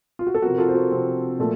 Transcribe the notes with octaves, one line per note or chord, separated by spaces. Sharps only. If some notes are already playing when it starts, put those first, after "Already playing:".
F4
F#4
A4
C3 F3 C4 F#4 A#4
A#4
F4 A4
C5
F#4 A#4
C3 F3 C4
A#2 F3 A3